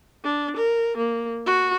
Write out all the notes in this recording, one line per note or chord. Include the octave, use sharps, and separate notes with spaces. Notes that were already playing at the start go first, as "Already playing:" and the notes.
D4
A#4
A#3
F#4